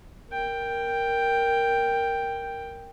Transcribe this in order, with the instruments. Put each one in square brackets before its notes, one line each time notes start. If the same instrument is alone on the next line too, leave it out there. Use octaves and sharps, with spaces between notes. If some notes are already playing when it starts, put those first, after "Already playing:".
[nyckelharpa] A#4 G5